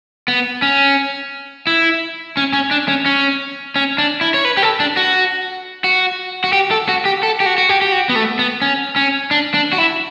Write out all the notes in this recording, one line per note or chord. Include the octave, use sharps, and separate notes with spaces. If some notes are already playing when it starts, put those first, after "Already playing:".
B3
C#4
E4
C#4
C#4
D4
C#4
C#4
C#4
D4
E4
C#5
B4
G4
A4
D4
F#4
F#4
F#4
G4
A4
F#4
G4
A4
G4
F#4
F#4
G4
G4
F#4
B3
A3
B3
C#4
C#4
D4
D4
F#4
E4